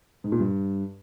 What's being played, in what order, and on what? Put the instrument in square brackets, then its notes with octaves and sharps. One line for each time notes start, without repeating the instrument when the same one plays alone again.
[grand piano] G#2
A#2
G2